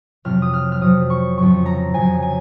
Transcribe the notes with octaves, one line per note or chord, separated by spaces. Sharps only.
F2 C3 F#3 F6
D#6
F6
F6
F2 C3 F#3 D#6
C#6
F2 C#3 F#3 C#6
A#5
F2 C#3 F#3 G#5
G#5